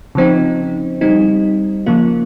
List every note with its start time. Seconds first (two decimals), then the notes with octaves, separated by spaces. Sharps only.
0.15 C#3 F3 C4 D#4
1.01 G3 C4 D#4
1.86 C#3 F3 A#3 F4